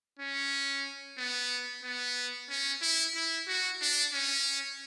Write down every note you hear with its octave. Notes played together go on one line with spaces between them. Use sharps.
C#4
B3
B3
C#4
E4
E4
F#4
D4
C#4